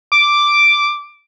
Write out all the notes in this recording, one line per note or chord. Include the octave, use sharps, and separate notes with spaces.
D6